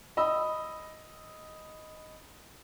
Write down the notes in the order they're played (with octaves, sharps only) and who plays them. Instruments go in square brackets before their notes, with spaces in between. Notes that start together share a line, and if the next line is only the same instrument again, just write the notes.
[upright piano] D#5 B5 E6